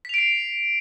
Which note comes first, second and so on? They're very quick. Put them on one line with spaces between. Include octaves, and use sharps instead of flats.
B6 F7 D7 C7